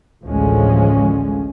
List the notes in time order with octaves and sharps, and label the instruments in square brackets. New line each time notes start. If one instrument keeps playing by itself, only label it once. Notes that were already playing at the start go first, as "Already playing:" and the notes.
[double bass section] A1 D2 D3 F3 G#3 C#4